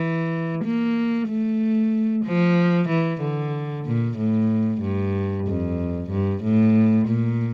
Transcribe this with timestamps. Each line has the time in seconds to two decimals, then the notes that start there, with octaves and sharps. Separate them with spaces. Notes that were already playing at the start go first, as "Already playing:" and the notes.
Already playing: E3
0.64 A#3
1.29 A3
2.25 F3
2.89 E3
3.21 D3
3.86 A#2
4.18 A2
4.82 G2
5.47 F2
6.10 G2
6.43 A2
7.08 A#2